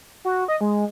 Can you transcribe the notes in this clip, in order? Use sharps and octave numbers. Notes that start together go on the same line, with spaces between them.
F#4
D#5
G#3